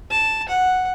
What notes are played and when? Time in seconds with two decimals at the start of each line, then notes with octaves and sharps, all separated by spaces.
0.11 A5
0.49 F#5